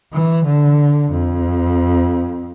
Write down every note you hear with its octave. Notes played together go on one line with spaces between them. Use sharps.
E3
D3
F2